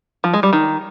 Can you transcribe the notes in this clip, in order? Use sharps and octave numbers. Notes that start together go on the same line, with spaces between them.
F3
G#3
G3
D#3